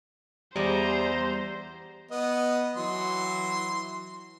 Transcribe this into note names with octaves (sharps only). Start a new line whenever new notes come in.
E2 G3 G4 C5 D5 G#5 A#5
B3 D#5
E3 F#3 C6